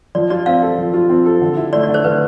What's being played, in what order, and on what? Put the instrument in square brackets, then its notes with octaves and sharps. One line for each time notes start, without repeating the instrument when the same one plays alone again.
[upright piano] F3 [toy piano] D5
[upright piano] F4 [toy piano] D5
[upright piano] C4 [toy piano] F5
[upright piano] A4
F3
F4
C4
A4
D3
E4
[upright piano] A3 [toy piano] D5
[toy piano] D5
[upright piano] D3
[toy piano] C5
[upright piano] D3 [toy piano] B4